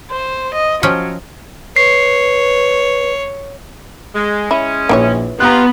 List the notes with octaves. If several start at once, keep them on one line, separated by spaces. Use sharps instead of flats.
C5
D#5
F3 F#3 C#4 G5
B4 C#5 C7
G#3
G#3 C#4 E4
A#1 E3 E4 C#5
B3 F4 G4 A#5 F#6